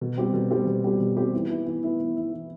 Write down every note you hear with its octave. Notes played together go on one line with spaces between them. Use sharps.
B2
G3 C4 G4
B2
G3 C4 G4
B2
G3 C4 G4
B2
G3 C4 G4
E3
B3 E4
E3
B3 E4
E3
B3 E4
E3